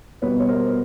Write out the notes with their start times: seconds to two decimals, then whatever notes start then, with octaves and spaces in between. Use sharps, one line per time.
0.22 B2 G3 B3 B4 C#5
0.40 C#5
0.49 A#4 C5